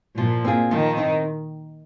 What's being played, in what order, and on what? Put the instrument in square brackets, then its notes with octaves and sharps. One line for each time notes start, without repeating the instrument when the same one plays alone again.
[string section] A#2 [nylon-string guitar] F3
[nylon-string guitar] C4 F4 G#4
[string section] D#3 [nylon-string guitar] F3
[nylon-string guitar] C4 D#4